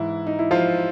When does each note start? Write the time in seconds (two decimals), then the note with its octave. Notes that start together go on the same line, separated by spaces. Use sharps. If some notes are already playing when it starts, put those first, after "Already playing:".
Already playing: G#2 E3 E4
0.27 D#4
0.39 E4
0.51 F3 F4